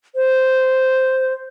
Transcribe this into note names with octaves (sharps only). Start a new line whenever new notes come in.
C5